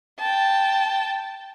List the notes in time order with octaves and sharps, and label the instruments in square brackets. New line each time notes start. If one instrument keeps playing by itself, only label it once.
[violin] G5 A5